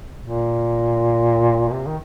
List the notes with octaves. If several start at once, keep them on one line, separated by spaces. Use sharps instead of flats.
A#2
C3
D#3